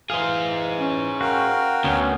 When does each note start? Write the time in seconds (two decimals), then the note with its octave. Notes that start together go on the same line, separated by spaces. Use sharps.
0.10 E3 G#4 C5 F5
0.78 C#4
1.21 F#4 A#4 F5 G5
1.84 D2 B3 C#4 F#4